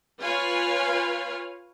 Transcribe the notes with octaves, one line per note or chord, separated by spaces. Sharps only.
F4 B4 C#5 F5 G#5